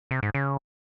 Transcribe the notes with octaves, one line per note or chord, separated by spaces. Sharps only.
C3
G#2
C#3